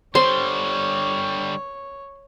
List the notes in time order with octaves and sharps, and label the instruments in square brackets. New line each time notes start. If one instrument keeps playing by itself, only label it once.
[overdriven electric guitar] D3 G3 [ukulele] C5 [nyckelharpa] C#5 [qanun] C6